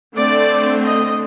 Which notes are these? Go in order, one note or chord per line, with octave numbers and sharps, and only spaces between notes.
D3 A3 C4 D5
D#5